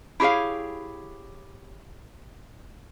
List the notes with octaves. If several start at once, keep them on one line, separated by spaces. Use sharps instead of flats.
E4 G4 G#4 C#5 F5